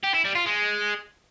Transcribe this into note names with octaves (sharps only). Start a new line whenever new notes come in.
G4
E4
G3
F4
G#3